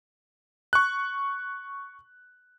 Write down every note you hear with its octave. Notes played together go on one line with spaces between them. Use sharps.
C#6 F#6